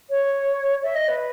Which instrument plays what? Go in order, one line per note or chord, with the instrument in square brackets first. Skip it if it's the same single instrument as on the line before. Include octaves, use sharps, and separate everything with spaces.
[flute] C#5
E5
D#5
B4